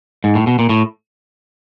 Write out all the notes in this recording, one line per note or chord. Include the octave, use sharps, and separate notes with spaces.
G#2
A2
B2
A#2
A2